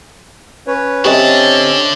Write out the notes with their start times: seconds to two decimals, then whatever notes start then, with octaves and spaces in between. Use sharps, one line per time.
0.67 C#4 B4 C#5
1.05 D3 C4 C#4 G4 C#5 D#5 E5 A5